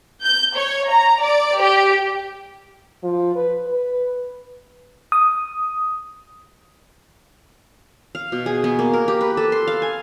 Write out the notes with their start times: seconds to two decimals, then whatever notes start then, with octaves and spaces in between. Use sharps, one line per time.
0.22 G6
0.54 C#5
0.87 A#5
1.20 D5
1.56 G4
3.03 F3
3.36 B4
3.67 B4
5.12 D#6
8.15 F5
8.32 B2
8.46 G#4
8.64 B3
8.79 A#3
8.94 A#4
9.08 G4
9.21 B4
9.37 A4
9.52 C6
9.67 F5
9.82 G#5